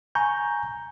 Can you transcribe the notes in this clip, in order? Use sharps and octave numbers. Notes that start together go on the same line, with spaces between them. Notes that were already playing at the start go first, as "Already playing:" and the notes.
G#5 A#5 C#6 G6